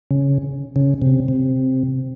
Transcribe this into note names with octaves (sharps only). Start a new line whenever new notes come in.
C#3
C#3
C3
C3